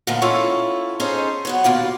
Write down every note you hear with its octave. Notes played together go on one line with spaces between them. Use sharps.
A#2 D3 D#3 F3 A3 B3
C#4 E4 F4 A4 C#5
C#4 D#4 G#4 A4 C5 C#5
F#2 B3 C#5
D#2 B2 F4 D5